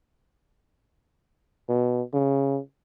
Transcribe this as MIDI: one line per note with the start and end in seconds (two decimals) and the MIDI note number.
1.69 2.02 47
2.13 2.59 49